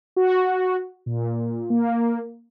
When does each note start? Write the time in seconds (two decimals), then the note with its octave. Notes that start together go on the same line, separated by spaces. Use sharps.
0.16 F#4
1.06 A#2
1.70 A#3